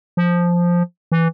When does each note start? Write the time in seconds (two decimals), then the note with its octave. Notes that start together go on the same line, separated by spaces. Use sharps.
0.17 F3
1.12 E3